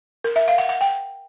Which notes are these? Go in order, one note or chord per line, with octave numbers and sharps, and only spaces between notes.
A#4
E5
F5
F#5
F#5
G5